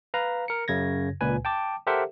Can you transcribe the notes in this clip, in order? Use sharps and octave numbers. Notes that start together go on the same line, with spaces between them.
B4 F5 A#5
A#4 C#7
F#2 C#3 G#6 A#6
C#2 A#2 B4 G#5
G5 A5 D6
G4 A4 A#4 C5 E5 F#5